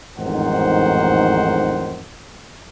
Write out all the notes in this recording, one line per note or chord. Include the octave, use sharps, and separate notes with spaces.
A1 F2 G#2 D#3 C5 F#5